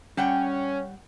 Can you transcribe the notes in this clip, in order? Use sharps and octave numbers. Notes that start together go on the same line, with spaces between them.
G3 C#4 F#5 G5